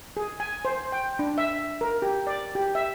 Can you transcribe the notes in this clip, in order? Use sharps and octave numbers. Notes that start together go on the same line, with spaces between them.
G#4
G#5
C5
G5
D4
E5
A#4
G4
D5
G4
E5